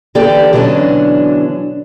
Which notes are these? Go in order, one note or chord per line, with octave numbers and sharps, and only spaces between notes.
D3 E3 A#3 G4 A4 D5
B2 D3 E3 F#3 C#4 D4